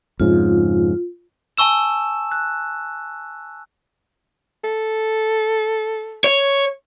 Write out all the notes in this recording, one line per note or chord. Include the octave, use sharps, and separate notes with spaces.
F2 G#2 C#3 F4
G#5 A5 C#6 E6 E7
F#6
A4
C#5